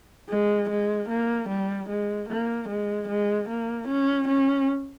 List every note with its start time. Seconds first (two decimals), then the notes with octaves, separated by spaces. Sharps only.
0.29 G#3
0.69 G#3
1.09 A#3
1.49 G3
1.89 G#3
2.29 A#3
2.69 G#3
3.08 G#3
3.49 A#3
3.88 C#4
4.28 C#4